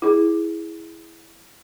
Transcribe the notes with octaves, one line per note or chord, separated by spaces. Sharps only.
E4 G#4